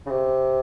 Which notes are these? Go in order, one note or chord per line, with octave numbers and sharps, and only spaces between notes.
C#3
C3